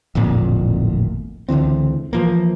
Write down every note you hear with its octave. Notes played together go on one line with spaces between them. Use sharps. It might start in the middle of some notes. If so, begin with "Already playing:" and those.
D1 G#1 F2 A#2
C#2 D3 E3 C4
E3 F3 A#3